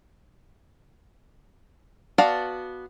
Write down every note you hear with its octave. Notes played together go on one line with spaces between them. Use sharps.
B3 F#4 D5 F5 A5